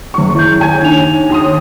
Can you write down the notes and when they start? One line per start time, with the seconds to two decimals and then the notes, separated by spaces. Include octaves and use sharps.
0.14 F#1 C#6
0.35 E4 G6
0.60 D#2 G#5 G#6
0.82 D4 D#4 F7
1.30 D#2 C6 D#6